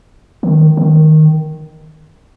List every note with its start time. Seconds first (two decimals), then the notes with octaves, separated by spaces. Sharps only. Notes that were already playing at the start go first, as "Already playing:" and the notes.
0.43 D#3
0.77 D#3